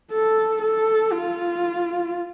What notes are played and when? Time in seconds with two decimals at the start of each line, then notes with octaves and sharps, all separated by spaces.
0.12 A4
0.62 A4
1.12 F4